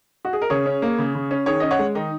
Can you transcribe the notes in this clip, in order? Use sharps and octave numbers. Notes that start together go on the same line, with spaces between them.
F#4
G#4
A#4
C#3 G#4 C#5
C#4
A#3
C#3
C#3
C#4
D#3 G#4 C#5
C#4 D#5
C#5 F#5
G#3
D#3 D#4